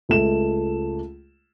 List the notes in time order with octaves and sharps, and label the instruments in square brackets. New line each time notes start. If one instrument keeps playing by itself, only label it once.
[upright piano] C#2 A3 E7